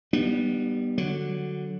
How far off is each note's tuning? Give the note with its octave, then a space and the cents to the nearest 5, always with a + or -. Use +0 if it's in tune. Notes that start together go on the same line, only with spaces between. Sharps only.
G3 -10 B3 -15 D4 +45
D3 +0 F#3 +0